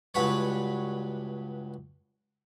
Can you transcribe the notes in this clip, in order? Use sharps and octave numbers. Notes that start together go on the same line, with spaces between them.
C#2 G2 F#4 B4 C#5